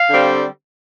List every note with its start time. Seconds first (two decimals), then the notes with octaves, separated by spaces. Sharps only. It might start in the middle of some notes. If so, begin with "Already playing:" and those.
Already playing: F5
0.09 D3 G3 C4